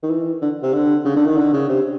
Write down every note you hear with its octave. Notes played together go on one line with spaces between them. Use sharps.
D#3
E3
D3
C3
D3
C#3
D3
D#3
D3
C#3
C3